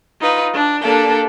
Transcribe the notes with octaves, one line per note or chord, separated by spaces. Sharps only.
D#4 F4 B4
D4
A#3 D4 G4 A4